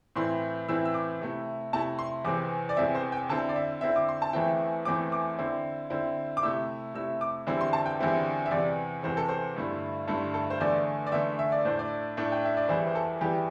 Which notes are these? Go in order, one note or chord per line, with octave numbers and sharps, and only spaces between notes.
A2 E3 C4 E4 C6
A2 E3 C4 E4 E6
E6
D6
C3 A3 E4
C3 A3 E4 A5
C6
E2 C3 E3 C4 D6
D5
E2 C3 E3 C4 E5
C5
G5
D3 C4 E4 A5
D5
E5
D3 C4 E4 E5
D6
C6
A5
E2 E3 A3 C4 E4 G5
E2 E3 A3 C4 E4 D6
D6
D3 C4 E4
D3 C4 E4
D6
C3 A3 E4 E6
C3 A3 E4 E6
D6
E2 D3 G3 C4 E4
C6
A5
G5
E2 D3 G3 C4 E4 E5
E5
E2 C3 E3 D5
E2 C3 E3 C5
A4
C5
G2 D3 A3 E4
G2 D3 A3 E4 A4
A4
C5
E2 D3 A3 D5
D5
E2 D3 A3 E5
E5
D5
A2 A3 D4 C5
D5
A2 A3 D4
G5
E5
D5
E2 E3 G3 E4 C5
C5
A4
E2 E3 G3 E4 G4